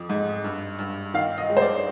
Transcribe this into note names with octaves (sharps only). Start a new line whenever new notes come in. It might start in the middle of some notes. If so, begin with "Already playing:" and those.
Already playing: F2 F3
G#2
G2
G2
D#3 F5
D#5
G#3
C5
D5